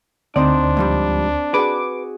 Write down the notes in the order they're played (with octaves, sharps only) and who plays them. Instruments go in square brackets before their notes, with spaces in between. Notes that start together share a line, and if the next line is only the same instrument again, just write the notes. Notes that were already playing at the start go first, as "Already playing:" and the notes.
[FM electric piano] D2 [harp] C4 D#4 C5 [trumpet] D4 [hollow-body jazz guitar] D5
[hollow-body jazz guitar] G#2 F3 G3
[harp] F#4 G#4 [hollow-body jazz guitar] B4 [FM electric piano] D6